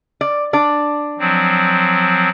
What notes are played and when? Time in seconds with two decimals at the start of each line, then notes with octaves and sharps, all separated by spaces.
0.21 D5
0.53 D4 D5
1.19 F3 F#3 C4